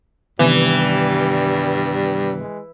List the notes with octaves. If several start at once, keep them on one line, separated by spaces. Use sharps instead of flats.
G2 C3 D#3 E3 G3 B3
G#3